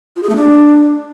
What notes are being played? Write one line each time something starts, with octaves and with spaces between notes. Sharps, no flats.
F4
G#4
A3
D4